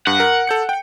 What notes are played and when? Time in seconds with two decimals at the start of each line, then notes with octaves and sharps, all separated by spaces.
0.07 G2 F#5
0.20 A#4
0.47 A4 G6 C#7
0.69 G5